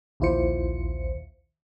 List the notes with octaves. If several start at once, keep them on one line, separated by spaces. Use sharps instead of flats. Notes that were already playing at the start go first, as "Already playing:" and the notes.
A#1 D#2 E4 F4 C5 C#7